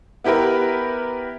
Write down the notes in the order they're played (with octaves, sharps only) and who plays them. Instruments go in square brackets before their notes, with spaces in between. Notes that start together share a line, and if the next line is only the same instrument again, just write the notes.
[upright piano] B3 E4 G4 A#4 B4